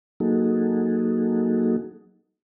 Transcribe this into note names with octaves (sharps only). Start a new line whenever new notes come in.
F#3 A#3 D#4 F#4 G#4 A4